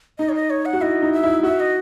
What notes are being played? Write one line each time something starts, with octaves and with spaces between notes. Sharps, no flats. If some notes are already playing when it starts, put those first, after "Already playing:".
D#4 D#5
C#5
D#5
C#5
F#5
F#4
E4 D#5
D#4
E5
E4
F#4 E5
D#5